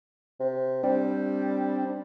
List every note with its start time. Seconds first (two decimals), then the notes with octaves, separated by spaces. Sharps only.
0.40 C3
0.83 G3 C4 D4